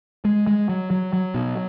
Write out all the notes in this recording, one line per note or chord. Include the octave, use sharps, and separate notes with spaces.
G#3
G#3
F#3
F#3
F#3
B2